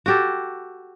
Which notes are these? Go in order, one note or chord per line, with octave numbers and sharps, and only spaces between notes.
F#4 G4 A4